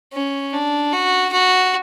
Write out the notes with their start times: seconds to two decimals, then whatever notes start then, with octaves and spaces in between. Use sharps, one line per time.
0.13 C#4
0.53 D4
0.93 F#4
1.32 F#4